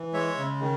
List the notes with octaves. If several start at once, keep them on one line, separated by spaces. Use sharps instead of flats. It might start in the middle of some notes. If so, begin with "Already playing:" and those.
Already playing: E3
G#3 C#5 E5
C#3
D#3